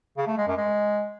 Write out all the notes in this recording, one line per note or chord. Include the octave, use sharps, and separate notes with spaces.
C#3
A3
G#3
F#2
G#3